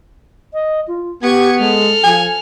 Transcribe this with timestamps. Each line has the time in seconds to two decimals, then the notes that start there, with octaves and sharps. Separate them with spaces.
0.53 D#5
0.88 F4
1.23 B3 G4 C#6 G#6
1.59 G#3 A4 F6
2.04 F3 G#5